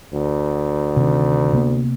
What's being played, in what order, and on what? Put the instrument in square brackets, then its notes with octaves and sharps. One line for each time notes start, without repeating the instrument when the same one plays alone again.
[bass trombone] D2
[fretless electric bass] C3 D#3
C3 A#3 B3